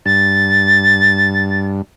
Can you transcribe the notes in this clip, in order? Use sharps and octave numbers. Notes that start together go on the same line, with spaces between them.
G2 A6